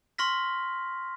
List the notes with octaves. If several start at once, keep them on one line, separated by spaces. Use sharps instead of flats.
C6 C#6 F6 A#6 B6